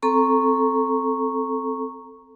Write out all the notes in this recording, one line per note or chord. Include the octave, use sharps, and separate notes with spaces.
C4 A4 A#5 C#6